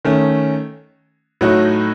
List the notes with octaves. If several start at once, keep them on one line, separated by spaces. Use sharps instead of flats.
D#3 A3 C#4
A2 F#3 A3 D#4 F#4